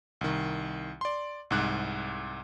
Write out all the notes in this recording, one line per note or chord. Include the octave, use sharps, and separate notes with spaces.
C2 D#3
D5 C6
C2 G#2 F#6